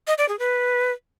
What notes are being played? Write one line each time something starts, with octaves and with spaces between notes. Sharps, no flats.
D#5
D5
G#4
B4